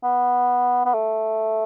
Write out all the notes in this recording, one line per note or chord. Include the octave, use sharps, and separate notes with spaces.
B3
B3
A3